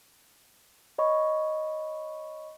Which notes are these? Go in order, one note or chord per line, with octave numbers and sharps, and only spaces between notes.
C#5 D#5 B5 C#6